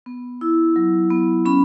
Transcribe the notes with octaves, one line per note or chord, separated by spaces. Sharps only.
B3
E4
F#3
B3
C#4 B5